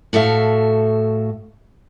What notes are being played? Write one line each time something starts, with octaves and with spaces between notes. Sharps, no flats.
A2 F#4 A4 E5 F5